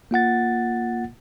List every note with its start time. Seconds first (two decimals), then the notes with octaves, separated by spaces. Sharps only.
0.11 A#3 F4 F#5 A6